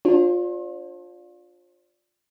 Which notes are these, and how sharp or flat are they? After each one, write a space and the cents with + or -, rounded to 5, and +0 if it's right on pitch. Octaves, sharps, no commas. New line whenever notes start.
D4 -5 F4 +20 C5 +45